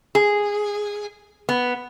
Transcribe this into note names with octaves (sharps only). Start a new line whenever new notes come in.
G#4
B3